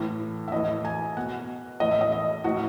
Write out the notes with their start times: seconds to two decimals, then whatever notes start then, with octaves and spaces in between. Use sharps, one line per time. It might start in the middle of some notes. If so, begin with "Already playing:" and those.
Already playing: A2 E3
0.48 E5
0.52 A2 E3 D#5
0.85 G#5
1.17 B2 F#5
1.80 A2 E3 D#5
1.91 E5
2.01 D#5
2.12 D#5
2.44 A2 E3 F#4